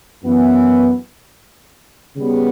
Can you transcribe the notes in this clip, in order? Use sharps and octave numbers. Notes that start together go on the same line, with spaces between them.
F#2 E3 B3
C#3 G3 B3